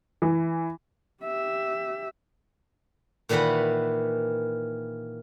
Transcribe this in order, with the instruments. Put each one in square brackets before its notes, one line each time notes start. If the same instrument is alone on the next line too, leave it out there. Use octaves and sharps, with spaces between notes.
[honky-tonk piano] E3
[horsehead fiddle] G4 E5
[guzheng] A#2 D#3 E3 B4 F#5 B5